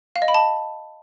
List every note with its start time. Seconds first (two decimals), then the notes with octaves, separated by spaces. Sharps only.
0.16 F5
0.22 D#5
0.28 B5
0.34 A5